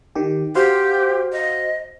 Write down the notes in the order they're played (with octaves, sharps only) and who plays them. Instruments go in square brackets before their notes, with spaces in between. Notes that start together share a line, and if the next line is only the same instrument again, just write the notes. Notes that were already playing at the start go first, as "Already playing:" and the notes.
[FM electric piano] D#3 G4
[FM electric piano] F#4 C5 F5 [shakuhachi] G4
[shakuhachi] D#5